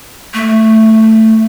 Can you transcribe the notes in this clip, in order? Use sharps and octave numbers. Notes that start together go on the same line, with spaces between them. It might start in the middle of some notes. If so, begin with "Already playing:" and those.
A3